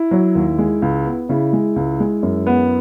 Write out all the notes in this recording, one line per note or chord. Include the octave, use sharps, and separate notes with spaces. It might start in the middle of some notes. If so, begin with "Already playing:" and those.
Already playing: E4
F#3
D#2
G#3
C#2
B3
C#3 E4
G#3
C#2
G#3
F#2
B3